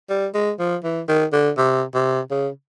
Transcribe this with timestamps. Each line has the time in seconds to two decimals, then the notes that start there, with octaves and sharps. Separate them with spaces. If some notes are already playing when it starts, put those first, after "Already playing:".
0.09 G3
0.34 G#3
0.59 F3
0.84 E3
1.08 D#3
1.33 D3
1.58 C3
1.95 C3
2.31 C#3